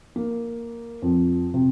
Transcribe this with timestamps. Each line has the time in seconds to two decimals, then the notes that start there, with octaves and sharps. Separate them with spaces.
0.16 A#3
1.02 F2
1.54 C3